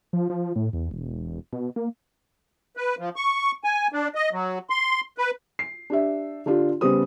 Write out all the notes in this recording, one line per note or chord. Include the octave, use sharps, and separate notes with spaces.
F3
F3
A2
E2
E1
B2
A#3
B4
F3
C#6
G#5
D4
D#5
F#3
C6
B4
C7
D4 G4 E5
D3 D4 F4 G4
C#3 G3 B3 C5 D#6